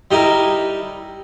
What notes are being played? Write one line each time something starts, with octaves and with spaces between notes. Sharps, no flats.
G3 D#4 E4 A#4